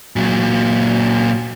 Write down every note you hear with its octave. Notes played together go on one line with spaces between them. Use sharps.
A#2 F#3